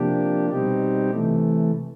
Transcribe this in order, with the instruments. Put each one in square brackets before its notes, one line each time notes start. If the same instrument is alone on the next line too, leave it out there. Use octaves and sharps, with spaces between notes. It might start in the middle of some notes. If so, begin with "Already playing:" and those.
Already playing: [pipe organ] C3 F3 A#3 D4 G4
B2 G3 C4 D#4 G4
C3 E3 A3